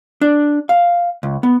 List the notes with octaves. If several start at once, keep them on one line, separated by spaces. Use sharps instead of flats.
D4
F5
C#2
B3